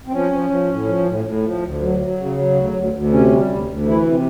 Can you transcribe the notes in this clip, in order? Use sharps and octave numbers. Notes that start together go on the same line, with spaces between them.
C4
F3 C#4
F3
F3
A2
F3
A2
A2
F3
D2
F#3
F#3
C#3
F#3
D2
D2
D2
C3 C#4
G3
D2
D2
E3 E4
C3